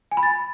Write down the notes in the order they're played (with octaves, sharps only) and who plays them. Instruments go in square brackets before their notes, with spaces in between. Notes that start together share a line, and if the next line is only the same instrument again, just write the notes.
[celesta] G#5
B5
A6